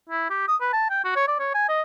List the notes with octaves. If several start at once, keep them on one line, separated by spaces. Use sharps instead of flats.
E4
G4
D#6
B4
A5
G5
F#4
C#5
D5
C#5
G#5
D#5